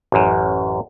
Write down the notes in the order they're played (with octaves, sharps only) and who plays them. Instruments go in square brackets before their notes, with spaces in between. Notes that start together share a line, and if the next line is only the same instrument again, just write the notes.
[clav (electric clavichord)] A1 F#2